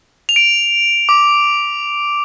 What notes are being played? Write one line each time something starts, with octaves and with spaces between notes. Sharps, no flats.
F7
D7
D6